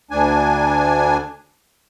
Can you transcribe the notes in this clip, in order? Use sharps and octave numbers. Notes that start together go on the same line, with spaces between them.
D2 D4 G#5